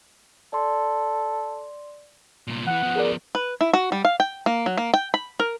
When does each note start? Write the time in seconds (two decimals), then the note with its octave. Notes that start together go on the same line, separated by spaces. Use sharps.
0.53 A4 D5 C6
2.48 C2 A#2
2.67 E2 E3 F#5
2.83 F3 B3
2.96 G#4 A#4 D5
3.35 B4
3.61 E4
3.73 F#4
3.92 G3
4.05 F5
4.20 G5
4.46 A#3
4.66 F#3
4.77 A#3
4.94 G5
5.14 B5
5.40 A#4